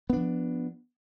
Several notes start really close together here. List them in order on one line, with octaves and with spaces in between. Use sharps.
B3 D4 F3